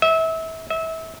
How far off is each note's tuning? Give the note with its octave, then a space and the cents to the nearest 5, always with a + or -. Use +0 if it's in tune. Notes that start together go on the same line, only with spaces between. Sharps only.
E5 -30
E5 -30